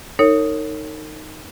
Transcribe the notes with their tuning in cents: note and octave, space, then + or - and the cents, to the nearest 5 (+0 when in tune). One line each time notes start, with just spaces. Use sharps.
D#4 +0 A#4 -40 C#5 +0